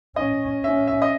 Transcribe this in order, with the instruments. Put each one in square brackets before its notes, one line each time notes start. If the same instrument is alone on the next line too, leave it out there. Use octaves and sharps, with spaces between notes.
[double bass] C#4 [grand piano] D#5
[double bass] C#4 [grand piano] E5
[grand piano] E5
D#5